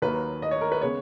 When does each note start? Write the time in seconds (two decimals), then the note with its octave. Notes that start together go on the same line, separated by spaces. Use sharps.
0.02 D#2 D#3 F#3 A#3 B4
0.42 D#5
0.51 C#5
0.61 A#4
0.72 B4
0.82 C#3 G#3 B3 C#5